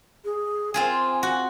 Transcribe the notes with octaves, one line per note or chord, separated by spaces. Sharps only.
G#4
C4 F4 G#4 G#5
F#4